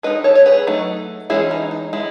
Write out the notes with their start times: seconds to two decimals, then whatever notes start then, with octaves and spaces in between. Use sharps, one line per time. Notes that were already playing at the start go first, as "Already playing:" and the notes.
0.03 G#3 D#4 B4 D#5
0.24 A4 C#5
0.35 C#5
0.46 G#4 B4
0.67 F#3 A3 D#4
1.30 E3 G#3 C#4 E4 G#4
1.51 D#4
1.71 D#4
1.93 G#3 E4